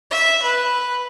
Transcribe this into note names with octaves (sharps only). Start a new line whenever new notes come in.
E5
B4